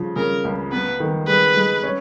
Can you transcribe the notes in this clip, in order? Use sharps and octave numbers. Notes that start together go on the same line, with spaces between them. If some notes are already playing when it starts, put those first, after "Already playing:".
Already playing: C#3 F3
C#3 A#4
C#2
B3 B4
D#3
G#3 B4
G#3
C#4